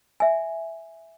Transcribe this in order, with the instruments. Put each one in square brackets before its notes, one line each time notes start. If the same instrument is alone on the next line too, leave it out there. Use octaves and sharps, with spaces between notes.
[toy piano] E5 G#5